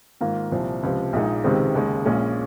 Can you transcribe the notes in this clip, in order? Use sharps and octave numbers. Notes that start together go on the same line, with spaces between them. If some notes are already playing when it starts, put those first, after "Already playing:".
G#2 D#3 A#3 F4
C2 A#2 F3
C#2 C3 F3
A#1 A#2 G#3 D#4
C#2 C3 D#3 G#3 C4
D#2 C#3 G#3
A#1 A#2 G#3 C#4